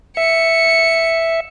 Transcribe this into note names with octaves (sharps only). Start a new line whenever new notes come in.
E5 C#7